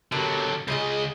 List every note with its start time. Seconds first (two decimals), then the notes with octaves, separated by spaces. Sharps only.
0.12 B2 D3 F#3 G4 A#4
0.68 C#2 C#3 F4 G#4 D#5